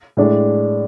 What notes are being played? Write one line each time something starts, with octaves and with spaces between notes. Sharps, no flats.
A2 G#3 D4